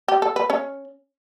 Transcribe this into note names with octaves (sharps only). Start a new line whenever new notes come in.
G4
A4
B4
C#4 C#5